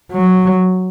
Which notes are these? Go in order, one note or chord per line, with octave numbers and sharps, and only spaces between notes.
F#3